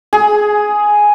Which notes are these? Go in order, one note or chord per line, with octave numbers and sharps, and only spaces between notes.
G#4